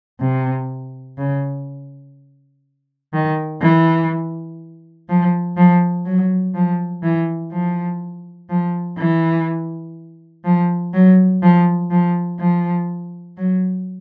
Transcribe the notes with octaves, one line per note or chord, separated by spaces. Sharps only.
C3
C#3
D#3
E3
F3
F3
F#3
F3
E3
F3
F3
E3
F3
F#3
F3
F3
F3
F#3